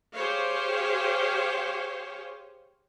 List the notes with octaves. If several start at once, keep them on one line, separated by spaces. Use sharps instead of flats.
G4 G#4 C5 C#5 F5